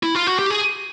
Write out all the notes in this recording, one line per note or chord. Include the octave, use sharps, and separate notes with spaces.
E4
F4
F#4
G4
G#4